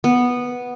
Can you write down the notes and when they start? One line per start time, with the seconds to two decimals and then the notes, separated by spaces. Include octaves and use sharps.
0.04 B3